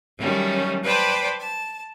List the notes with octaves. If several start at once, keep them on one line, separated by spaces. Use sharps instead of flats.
D#3 F#3 G3 A3 C#4
B4 C5 D5 G5 A5 B5
A5